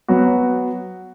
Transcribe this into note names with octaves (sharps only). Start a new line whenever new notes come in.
F#3 B3 F#4